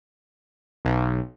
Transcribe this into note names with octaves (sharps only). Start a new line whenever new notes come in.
B1